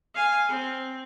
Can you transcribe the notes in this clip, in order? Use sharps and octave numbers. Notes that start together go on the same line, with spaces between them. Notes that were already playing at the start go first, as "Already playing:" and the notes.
F5 G#5
C4